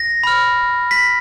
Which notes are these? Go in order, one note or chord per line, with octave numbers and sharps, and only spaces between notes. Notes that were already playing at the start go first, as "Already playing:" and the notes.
Already playing: A#6
B5 F6
B6